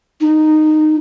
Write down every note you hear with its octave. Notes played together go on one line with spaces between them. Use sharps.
D#4